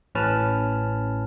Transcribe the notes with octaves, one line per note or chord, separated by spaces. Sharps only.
A1 A2 C#4 B4 A5 F6